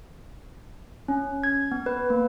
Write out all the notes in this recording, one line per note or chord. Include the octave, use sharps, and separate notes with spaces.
C#4
G#6
B3
B4
A#3